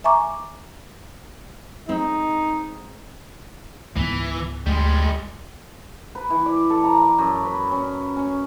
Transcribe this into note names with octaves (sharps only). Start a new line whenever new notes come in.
E5 G#5 A#5 C#6 D6
G#3 C4 D#4
C#2 G#2 E3 B3
D2 G3 G#3
B4
E3
D5
A4
A#5
D6
F#2
B4
C#4
C#4